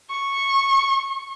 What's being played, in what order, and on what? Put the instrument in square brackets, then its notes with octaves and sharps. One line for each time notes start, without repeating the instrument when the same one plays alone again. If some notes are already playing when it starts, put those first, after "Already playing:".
[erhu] C#6